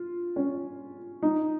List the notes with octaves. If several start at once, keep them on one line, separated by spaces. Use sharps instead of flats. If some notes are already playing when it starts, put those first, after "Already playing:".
Already playing: F4
C#4
D#4